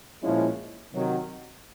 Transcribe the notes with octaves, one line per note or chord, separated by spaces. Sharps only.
A#2 F3 G#3 C#4 E4
C3 D#3 F#3